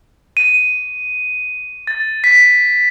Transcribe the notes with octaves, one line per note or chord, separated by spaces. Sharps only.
D#7
A6
B6